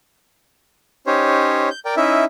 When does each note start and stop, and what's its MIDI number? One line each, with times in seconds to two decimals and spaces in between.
1.07 1.69 61
1.07 1.69 63
1.07 1.69 67
1.07 1.69 72
1.07 1.69 73
1.70 1.79 91
1.85 1.95 70
1.85 1.95 74
1.85 1.95 79
1.97 2.25 61
1.97 2.25 63
1.97 2.25 64
1.97 2.25 76